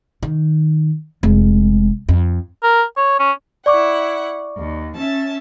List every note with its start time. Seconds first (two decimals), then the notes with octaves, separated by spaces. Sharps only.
0.23 D#3
1.23 F1 G#3
2.09 F2
2.63 A#4
2.97 C#5
3.19 C#4
3.66 E4 D5 F#5 C#6 D6
4.57 D#2
4.95 C#4 E5 A5